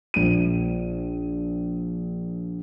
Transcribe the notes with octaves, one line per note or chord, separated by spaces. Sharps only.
A#1 D#7